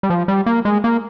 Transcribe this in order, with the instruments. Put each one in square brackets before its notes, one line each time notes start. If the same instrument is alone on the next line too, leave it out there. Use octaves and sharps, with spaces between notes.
[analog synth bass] G3
F3
G3
A#3
G#3
A#3